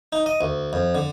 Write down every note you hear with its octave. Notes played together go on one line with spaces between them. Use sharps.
D#4
D#5
D2
F2
D3